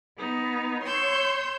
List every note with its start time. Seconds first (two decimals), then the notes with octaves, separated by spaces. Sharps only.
0.18 B3 D#4
0.83 C#5 C6 E6 G6